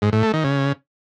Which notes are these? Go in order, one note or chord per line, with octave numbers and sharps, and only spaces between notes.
G#2
A2
A3
D#3
C#3